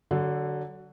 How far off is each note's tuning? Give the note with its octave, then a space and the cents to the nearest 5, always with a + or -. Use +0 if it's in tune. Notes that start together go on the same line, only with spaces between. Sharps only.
D3 +0 F#3 +25 A4 +0